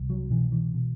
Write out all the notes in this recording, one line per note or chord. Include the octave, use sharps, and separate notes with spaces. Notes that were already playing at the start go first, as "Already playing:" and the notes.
Already playing: C2
F#3
B2 E3
E3
B2